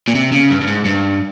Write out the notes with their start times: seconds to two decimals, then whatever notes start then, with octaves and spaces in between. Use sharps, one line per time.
0.08 A#2
0.15 C3
0.32 C#3
0.50 G2
0.61 G2
0.67 G#2
0.85 G2